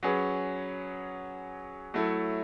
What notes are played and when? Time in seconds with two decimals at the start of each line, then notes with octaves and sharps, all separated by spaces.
0.03 F#3 C#4 G#4 B4
1.94 F#3 A3 E4 A4